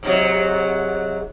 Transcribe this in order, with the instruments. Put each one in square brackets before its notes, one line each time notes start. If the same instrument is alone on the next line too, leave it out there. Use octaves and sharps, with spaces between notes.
[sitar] G#2 C3 F#3